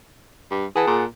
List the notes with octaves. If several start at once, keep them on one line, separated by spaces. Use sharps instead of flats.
G2
E3 G#4 F#5 A5
A#2